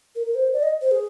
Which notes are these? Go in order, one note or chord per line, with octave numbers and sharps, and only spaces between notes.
A#4
A#4
C5
D5
D#5
C5
G#4